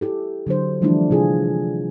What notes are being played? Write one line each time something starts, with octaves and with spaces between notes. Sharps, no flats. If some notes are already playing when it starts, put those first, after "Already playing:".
E4 G4 A4
D3 F#3 D4 C5
E3 F3 G3 A3 D4 E4
C3 F4 G#4